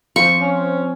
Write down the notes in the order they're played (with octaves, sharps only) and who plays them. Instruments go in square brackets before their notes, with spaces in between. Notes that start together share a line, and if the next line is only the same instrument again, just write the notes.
[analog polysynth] F3 C4 [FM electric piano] F4 [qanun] C#6
[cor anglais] C#4